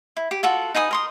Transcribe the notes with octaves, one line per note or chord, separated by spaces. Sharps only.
E4
G4
F4 F#4 A4 F#5
D#4 B4 G#5 D#6
A#4 C6 D#6